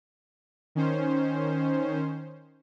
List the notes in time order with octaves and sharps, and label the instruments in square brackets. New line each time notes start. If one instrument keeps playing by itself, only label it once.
[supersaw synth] D#3 C#4 C5